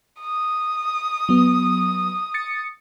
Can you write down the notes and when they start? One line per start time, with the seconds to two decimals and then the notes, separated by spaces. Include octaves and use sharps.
0.21 D#6
1.29 F#3 B3
2.34 A6 C#7